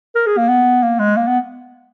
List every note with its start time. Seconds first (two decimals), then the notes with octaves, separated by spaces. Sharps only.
0.15 A#4
0.27 G#4
0.38 A#3
0.49 B3
0.83 A#3
0.99 G#3
1.17 A#3
1.27 B3